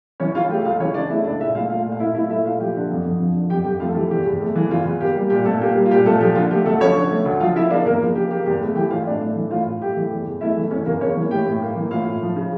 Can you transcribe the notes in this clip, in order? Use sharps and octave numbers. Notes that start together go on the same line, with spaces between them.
E3 C#4 C#5
C#3 F4 F5
A3 G4 G5
C#2 F4 F5
E3 C#4 C#5
C#3 D4 D5
A3 E4 E5
C#2 D4 D5
A#2 E4 E5
A3 F4 F5
A3 F4 F5
A#2
F5
A#2 E4 E5
A3 E4 E5
A3 E4 E5
A#2 F4 F5
F3 G4 G5
D3
F2
F2
F3
D3
F2 G4 G5
F2 G4 G5
A3 F4 F5
A4
E3 G4
E2 G4
E2
A3
E3
E2 F4
E2
A#3 G4
G3
A#2 G4
A#2 A3 A4
A#3 G4
G3
F4
A#2 G4
A#2 A3 A4
F3 G4
D3 F4
A3 G4
D2 A3 A4
F3 C#4 C#5
D3
A3
D2
F3 F4 F5
C#3 E4 E5
A#3 D4 D5
E2 A#3 A#4
F3
C#3 G4
A#3 G4
E2 G4
A3
E3 G4 G5
A2 F4 F5
A2 D4 D5
A3
E3
A2 F4 F5
A2
A3 G4 G5
E3
E2
E2
A3 E4 E5
E3
E2 C#4 C#5
E2 A#3 A#4
A#3 C#4 C#5
E3
A2 G4 G5
A2
A#3
E3
A2 F4 F5
A2
F3
C#3